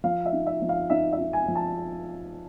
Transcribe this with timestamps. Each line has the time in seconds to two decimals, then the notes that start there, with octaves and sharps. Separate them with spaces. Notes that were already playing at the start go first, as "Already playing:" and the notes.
0.04 F3 F5
0.25 E5
0.33 D#4
0.46 E5
0.62 F3
0.69 F5
0.90 D#4 E5
1.13 E5
1.19 D#4
1.33 G#5
1.48 F3
1.56 A5